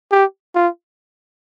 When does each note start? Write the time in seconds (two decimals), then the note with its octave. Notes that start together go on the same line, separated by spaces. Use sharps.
0.12 G4
0.55 F4